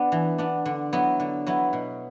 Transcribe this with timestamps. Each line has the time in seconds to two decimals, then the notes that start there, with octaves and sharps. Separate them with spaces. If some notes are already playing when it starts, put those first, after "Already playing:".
Already playing: B3 D4
0.12 E3
0.38 B3 D4
0.66 D3
0.93 F#3 B3 E4
1.20 D3
1.47 F#3 B3 E4
1.73 B2